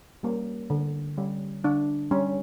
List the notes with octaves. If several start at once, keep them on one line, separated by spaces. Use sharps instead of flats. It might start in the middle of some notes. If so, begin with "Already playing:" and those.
G3 A#3 C#4
D3
G3 C#4
D3 D4
G3 C#4